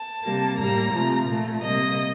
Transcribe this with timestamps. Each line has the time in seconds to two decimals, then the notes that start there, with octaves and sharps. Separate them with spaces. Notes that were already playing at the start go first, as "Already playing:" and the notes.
Already playing: A5
0.24 C3 G3 A#3
0.58 A2 G3 A#3 A#5
0.93 C3 F3 A3
1.28 A#2 A3
1.63 C3 G3 A#3 D#5